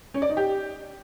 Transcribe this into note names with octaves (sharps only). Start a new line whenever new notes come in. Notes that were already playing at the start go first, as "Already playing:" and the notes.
C#4
D5
D#4
G4